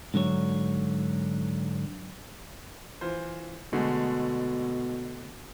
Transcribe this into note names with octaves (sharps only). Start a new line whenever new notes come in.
G#2 D3 F#3 C#5
E3 F4 C5
B2 D3 G#3 A3